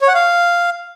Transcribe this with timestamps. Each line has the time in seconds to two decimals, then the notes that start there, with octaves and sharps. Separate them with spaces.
0.01 C#5
0.08 F#5
0.14 F5